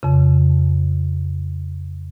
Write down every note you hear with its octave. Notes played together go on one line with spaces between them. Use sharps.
F2 C#3